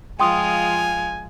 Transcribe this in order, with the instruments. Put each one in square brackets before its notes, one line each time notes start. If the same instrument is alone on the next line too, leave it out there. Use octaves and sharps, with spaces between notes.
[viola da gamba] F3 G#3 F4 [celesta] G5 C6 D#6 [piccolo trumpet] G#5